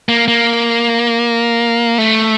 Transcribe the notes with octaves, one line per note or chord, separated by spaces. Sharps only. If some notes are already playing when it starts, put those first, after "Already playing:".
A#3
A#3
A3